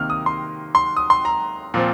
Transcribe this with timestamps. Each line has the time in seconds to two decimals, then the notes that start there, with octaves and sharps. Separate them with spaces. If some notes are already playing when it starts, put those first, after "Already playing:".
Already playing: C3 D#3 A#3 F6
0.10 D#6
0.26 C6
0.75 C6
0.97 D#6
1.10 C6
1.25 A#5
1.74 A#2 F3 C4